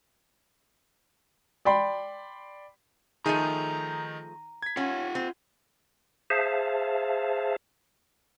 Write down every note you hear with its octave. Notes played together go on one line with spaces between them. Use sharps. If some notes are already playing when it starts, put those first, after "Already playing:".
D5 G5 B5 C6
D#3 F3 A3 D#4 G#4 A#5 D#7
G#6 B6
C#4 F4 F#5
C4
G#4 C5 E5 F5 A5